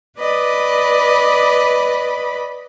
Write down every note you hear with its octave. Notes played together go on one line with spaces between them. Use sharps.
B4 D5 D#5 B5